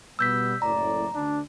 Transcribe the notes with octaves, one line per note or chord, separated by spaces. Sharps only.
B2 G3 B3 E6 G6 B6
F#1 A2 D5 A#5
D2 D4